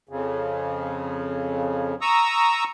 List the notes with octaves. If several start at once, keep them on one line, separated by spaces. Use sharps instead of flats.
F2 C#3
A#5 C#6 D#6 E6